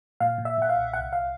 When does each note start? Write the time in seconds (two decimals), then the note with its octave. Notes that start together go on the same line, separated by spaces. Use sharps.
0.20 A#2 F5
0.38 A#2
0.45 E5
0.57 A#2 F#5
0.69 F5
0.76 B1
0.93 C2 F#5
1.13 F5